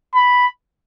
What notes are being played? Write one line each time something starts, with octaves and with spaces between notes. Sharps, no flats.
B5